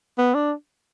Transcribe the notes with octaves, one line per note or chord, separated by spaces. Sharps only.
B3
D4